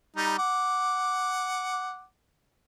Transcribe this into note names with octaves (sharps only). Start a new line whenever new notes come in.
G3 D#4
F#5 D6